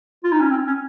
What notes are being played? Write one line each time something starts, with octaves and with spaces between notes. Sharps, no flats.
F4
D#4
C#4
C4
C#4